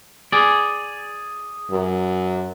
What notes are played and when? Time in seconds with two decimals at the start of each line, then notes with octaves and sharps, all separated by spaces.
0.32 G#4 D5
1.71 F#2